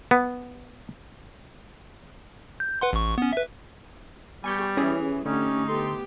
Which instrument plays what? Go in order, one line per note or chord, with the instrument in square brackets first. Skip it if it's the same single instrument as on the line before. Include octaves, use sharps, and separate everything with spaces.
[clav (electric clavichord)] B3
[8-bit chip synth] G6
B4 F#5 C6
A1 C#6
B3 C#4
B4 E5
[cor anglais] G3 [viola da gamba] B3 G4 [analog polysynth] G#5 C#6 G6
[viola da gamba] E3 [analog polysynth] C#4 E4 G#4
[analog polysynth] D3 [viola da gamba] A3 G4 [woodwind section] C#4 [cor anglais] D#4
[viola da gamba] B3 G4 [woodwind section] A4 C6